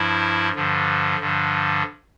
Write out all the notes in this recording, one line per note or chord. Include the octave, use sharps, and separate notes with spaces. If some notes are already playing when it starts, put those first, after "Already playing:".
Already playing: G2 F3 E4
G2 D3 F3
G2 D3 F3